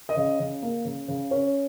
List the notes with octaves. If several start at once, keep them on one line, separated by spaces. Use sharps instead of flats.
D#5
C#3
C#3
A#3
C#3
C#3
C#4